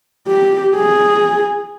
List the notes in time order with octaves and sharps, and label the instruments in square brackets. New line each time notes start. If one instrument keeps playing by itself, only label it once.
[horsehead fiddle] G4
G#4